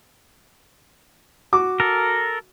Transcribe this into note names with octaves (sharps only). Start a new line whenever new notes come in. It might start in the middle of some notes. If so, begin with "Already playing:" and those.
F#4 D6
A4 A#4